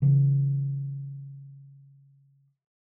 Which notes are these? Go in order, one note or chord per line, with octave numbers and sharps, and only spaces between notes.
C#3 E3